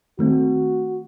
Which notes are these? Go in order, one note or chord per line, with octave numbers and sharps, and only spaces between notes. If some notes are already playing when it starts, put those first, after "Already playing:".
D#3 A3 C4 F#4